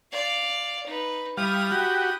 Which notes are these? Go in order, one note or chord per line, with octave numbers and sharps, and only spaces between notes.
D5 F5
D#4 B4
G3 E4 F5 D#6
F#4 G4